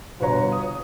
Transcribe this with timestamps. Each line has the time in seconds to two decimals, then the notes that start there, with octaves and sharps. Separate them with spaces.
0.20 G1 B2 B4 C#5 A#5
0.52 D#6